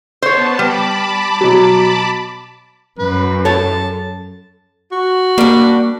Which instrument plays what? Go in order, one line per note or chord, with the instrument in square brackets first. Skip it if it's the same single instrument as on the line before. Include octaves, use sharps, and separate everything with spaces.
[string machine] B3 A5 [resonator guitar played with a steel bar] C5 C#5
[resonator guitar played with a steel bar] G3 [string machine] A5 B5 D6
[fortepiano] B2 F#3
[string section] F#2 [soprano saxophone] B4
[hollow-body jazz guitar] A4 C#5 [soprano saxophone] A5
[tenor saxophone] F#4
[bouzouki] G3 D4 [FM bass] A#3